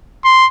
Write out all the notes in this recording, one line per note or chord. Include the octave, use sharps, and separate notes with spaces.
C6